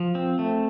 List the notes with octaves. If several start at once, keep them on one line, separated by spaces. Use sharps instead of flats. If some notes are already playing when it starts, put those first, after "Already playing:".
Already playing: F3
C4
A3